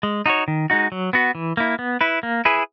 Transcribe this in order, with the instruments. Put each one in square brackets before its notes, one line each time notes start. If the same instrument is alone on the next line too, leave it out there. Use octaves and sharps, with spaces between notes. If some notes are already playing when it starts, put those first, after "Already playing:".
[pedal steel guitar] G#3
D#4 F#4 C#5
D#3
G#3 D#4 F#4
F#3
B3 F#4
E3
A#3 E4
B3
E4 B4
A#3
E4 G#4 B4